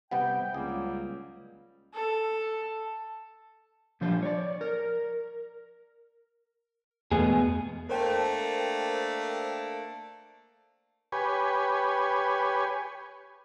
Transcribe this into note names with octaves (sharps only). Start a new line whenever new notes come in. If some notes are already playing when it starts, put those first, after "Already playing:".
C3 G3 B3 F#5 G5
C#2 F#3 G3 A#3 G#4
A4
A#2 F3 G3 D4 C5
C#5 D5
A#4
E2 B2 G#3 A3 B3 G#4
A3 A#3 D4 A#4 C5 G5
G4 B4 C#5 G#5